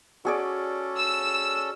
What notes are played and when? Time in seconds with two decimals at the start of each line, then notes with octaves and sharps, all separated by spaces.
0.25 C#4 F#4 G#4 A4 D5
0.97 E6